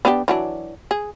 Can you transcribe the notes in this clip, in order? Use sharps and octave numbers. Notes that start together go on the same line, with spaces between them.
B3 D4 G4
E3 F#3 D4
G#4